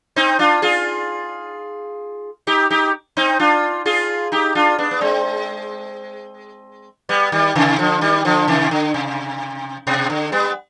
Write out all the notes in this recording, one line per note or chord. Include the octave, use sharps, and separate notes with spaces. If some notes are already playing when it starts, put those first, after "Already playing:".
C4 D#4
D4 F4
F4 G#4
D#4 G4
D#4 G4
C4 D#4
D4 F4
F4 G#4
D#4 G4
D4 F4
B3 D4
B3
G#3 C4
G3 B3
D#3 G3
C3 D#3
D3 F3
D#3 G3
D3 F3
C3 D#3
D3
C3
B2
D3
G3 B3